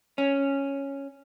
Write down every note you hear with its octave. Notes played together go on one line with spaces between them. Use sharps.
C#4